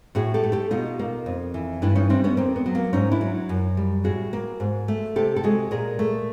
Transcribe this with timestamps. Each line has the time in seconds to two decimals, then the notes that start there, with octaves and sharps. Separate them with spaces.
0.15 A2 F#4 G#4
0.34 G4 A4
0.43 A3
0.52 G4 A4
0.71 B2 D#4 F4
0.99 A#3
1.26 F2
1.54 E3
1.82 G2 D4 E4
1.95 C#4 D#4
2.09 G3 C4 D4
2.24 B3 C#4
2.37 F2 A#3 C4
2.56 B3
2.66 F#3
2.75 A#3
2.93 G#2 C#4 D#4
3.12 D4 E4
3.21 F#3
3.49 F#2
3.77 G3
4.04 A2 F#4 G#4
4.33 A#3
4.60 G#2
4.88 A3
5.16 C3 G4 A4
5.36 A4
5.44 G#3 F#4 G#4
5.71 A#2 G#4 A#4
5.99 A3